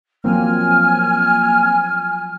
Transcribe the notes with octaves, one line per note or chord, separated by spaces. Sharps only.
F3 F#3 A#3 C4 E4 G#5 F6